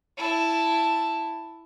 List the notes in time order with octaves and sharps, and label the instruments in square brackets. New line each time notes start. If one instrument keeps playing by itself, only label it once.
[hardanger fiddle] E4 A5